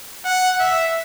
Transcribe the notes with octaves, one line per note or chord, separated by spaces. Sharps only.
F#5
E5